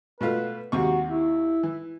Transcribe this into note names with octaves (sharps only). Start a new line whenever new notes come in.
B2 A3 F4 B4
D#2 C3 F#4 C#6
E4
E3